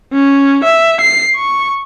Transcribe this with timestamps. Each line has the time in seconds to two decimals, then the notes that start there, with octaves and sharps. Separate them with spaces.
0.13 C#4
0.64 E5
1.01 C7
1.36 C#6